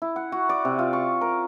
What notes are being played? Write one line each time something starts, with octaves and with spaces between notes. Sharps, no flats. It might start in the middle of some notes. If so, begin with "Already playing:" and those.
E4
F#5
F#4
D5
C3
F4
C#6
A#4